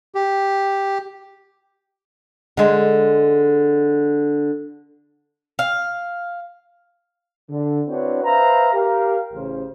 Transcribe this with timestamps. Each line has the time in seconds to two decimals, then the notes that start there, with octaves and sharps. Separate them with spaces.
0.15 G4
2.57 D3 G#3
5.59 F5
7.50 D3
7.88 C4 D4 E4 F#4 B4 C#5
8.23 B4 C5 E5 F5 A#5
8.73 G4 A#4 F5
9.33 A1 C#3 C5